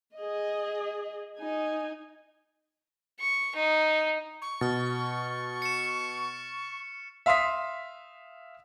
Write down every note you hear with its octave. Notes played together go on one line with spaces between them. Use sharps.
G#4 D#5
D#4 G#5
C#6
D#4
C#6
B2 F6 A6
C#7 E7
E5 F5 C6 D#6 B6